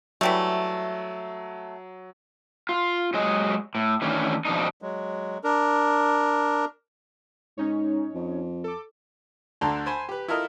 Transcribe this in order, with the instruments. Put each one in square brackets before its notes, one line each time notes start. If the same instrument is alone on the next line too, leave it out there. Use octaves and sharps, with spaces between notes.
[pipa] E3 G3 A3 [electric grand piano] F#3
[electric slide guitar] F4
F#3 G#3 D#5
A2
D#3 E3 A3 C#4 D4
F2 B2 D#3 D4 D#4
[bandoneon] F#3 G#3
D4 A#4
[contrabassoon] G#2 [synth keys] C#4 D#4 C#5
[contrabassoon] F2
[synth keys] A4 D6
[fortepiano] D2 D3 D4 A5 A#5 C6
C5 G#5 B5 C6
G4 B4
E4 F4 A4 A#4 D#5